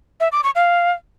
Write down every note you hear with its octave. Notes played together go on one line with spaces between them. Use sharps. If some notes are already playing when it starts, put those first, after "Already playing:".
E5
D6
C#6
F5